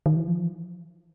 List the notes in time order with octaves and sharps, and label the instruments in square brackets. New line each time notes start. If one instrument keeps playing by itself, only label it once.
[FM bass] D#3
E3
F3